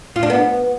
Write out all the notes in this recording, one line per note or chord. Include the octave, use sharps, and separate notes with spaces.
F4
D4
B3